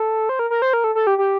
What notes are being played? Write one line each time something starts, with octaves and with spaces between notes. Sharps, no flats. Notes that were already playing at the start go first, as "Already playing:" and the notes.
Already playing: A4
C5
A#4
A#4
C5
A#4
A4
A4
G4
G4